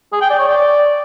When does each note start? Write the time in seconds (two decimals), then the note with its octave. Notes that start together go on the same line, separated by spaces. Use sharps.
0.13 G#4
0.21 G5
0.30 D5
0.39 C#5
0.47 D5